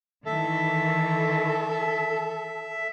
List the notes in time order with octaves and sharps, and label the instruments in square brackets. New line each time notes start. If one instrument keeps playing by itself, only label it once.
[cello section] D#3 E3 [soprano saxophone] A4 [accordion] E5